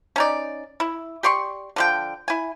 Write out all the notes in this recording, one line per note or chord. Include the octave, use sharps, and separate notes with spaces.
C#4 D#4 D5
E4
G4 D5 C6 C#6
D3 F3 G5
E4 G#5